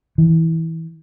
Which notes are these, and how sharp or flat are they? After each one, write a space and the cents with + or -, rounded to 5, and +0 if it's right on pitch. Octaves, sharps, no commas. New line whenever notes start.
E3 -20